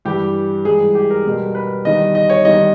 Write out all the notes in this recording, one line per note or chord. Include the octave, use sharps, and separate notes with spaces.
G2 E3 G3 G4
G#2 E3 G3 G#4
G4
A#4
E2 B2 G3
B4
E2 D#3 G3 D#5
D#5
C#5
E2 D#3 G3 D#5